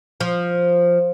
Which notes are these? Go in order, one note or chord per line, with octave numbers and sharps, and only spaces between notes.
F3